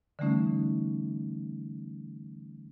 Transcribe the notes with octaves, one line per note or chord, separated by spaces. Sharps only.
D3 E3 G3 A3 C#4 D#4